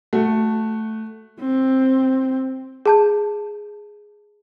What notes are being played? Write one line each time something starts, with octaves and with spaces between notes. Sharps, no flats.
A3 F#4
C4
G#4 A5 G6